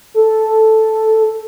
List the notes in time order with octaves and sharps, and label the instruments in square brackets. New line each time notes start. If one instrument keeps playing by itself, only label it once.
[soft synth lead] A4